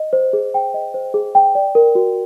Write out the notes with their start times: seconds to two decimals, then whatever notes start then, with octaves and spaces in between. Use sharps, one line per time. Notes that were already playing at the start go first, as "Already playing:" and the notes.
Already playing: D#5
0.13 C5
0.33 G#4
0.54 G5
0.74 D#5
0.94 C5
1.14 G#4
1.35 G5
1.55 D5
1.75 A#4
1.95 F#4